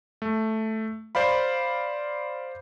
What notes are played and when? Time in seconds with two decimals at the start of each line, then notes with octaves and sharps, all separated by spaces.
0.22 A3
1.15 C5 D5 F5 B5